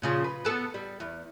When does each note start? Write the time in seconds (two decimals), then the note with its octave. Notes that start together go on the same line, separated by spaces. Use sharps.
0.02 A#2 C#3 F3
0.24 B4
0.45 B3 A4
0.74 G3
1.00 E2